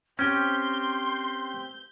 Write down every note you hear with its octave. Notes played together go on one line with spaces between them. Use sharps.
C4 C#4 G4 C6 G6